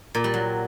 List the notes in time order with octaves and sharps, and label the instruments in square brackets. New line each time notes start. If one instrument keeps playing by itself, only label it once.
[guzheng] A#2
G3
F#3